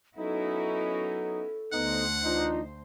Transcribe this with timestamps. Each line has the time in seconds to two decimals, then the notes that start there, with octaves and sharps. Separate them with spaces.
0.17 F#3 B3 C#4 D#4 E4 F#4 A4
1.73 D2 B3 D#4 C5 F#5
2.24 E3 D4 D#4 F4